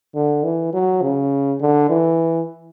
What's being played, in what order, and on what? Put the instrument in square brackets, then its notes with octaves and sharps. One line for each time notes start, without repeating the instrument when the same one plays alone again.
[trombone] D3
E3
F#3
C#3
D3
E3